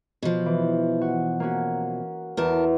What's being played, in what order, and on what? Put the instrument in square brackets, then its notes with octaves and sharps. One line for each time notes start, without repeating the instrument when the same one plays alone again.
[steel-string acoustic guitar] B2 F3
[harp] E3
F#4
A#3 C#4 F#4
[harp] E2 [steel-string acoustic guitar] A#4 A5